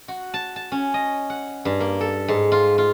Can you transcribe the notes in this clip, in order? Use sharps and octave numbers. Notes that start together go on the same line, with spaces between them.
F#4
A5
A5
C#4
D#5
F#5
G2
A#3
A4
G#2
F4
F4